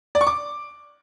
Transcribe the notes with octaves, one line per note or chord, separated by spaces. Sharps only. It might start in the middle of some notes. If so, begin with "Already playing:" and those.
D5
C#6
D6